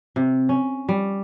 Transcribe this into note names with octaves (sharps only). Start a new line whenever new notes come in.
C3
C#4
G3